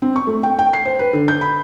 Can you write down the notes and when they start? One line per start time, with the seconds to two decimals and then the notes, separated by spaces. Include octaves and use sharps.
0.02 C4
0.16 C#6
0.27 A3
0.43 G5
0.59 G5
0.73 C7
0.85 C5
0.99 B4
1.13 D3
1.28 G6
1.41 B5